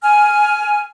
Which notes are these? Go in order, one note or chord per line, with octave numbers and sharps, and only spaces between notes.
G#5 F6